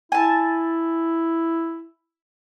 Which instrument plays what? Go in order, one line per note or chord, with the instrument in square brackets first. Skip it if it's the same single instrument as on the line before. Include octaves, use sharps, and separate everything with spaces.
[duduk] E4 [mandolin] G#5 A5